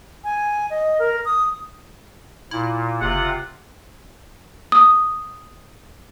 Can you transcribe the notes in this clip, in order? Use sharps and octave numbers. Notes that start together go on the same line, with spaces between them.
G#5
D#5
A#4
D#6
A#2 E4
F#1 C3 F4 F#5
D#6